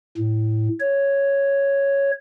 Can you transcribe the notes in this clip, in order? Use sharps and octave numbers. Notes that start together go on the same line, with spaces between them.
A2
C#5